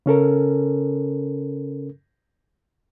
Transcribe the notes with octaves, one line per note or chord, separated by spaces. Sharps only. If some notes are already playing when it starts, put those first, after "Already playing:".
C#3 C#4 A4 A#4